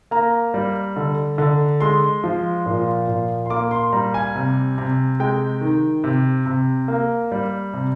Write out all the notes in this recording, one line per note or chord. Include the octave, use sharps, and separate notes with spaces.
A#3 A#5
G3
D3
D3
G#3 C6
F3
A#2
A#2
C6
A#3 D6
C6
G3 A#5
G#5
C3
C3
G#3 G5
D#3
C3
C3
A#3
G3
C3